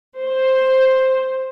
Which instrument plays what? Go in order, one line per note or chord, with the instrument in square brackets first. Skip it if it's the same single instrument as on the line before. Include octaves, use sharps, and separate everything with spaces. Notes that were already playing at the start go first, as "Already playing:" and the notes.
[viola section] C5